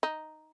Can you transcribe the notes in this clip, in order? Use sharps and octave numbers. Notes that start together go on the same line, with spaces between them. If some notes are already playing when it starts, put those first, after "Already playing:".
D#4